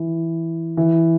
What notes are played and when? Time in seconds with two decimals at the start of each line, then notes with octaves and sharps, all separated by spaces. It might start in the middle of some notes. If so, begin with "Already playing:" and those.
Already playing: E3
0.77 E3